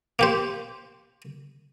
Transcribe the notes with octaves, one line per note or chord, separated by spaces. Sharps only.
A#3 G4 C5